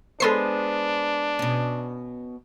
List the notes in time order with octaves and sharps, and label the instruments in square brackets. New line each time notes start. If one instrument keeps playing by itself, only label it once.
[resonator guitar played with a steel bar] G#3 B3 C5 [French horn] D4 [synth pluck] A4 C6 C7
[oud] B2 C#4